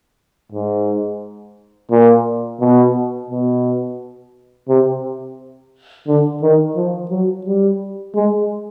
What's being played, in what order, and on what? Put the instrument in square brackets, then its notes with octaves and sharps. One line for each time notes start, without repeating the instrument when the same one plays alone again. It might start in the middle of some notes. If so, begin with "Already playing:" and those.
[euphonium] G#2
A#2
B2
B2
C3
D3
D#3
F3
F#3
G3
G#3